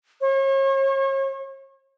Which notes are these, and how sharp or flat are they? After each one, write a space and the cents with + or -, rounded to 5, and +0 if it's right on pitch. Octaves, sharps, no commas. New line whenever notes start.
C#5 -40